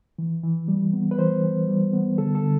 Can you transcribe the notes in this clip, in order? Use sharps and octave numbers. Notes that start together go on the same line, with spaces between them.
E3
E3
G3
B3
B4
E3 C5
E3
G3
B3
D3 A4
A4
D3